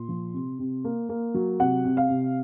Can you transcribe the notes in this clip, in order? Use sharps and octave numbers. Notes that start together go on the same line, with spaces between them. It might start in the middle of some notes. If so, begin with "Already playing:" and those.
Already playing: A#2 C6
F3
C3
C3
A#3
A#3
F#3
C3 F#5
C3
F5
C3